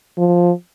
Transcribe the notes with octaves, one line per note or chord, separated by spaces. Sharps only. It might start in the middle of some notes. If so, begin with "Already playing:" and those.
F3